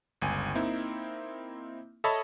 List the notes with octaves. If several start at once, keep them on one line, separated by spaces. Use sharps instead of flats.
G1 C#2 G#5
A#3 C4 D#4 E4
A4 C#5 D#5 E5 A5 B5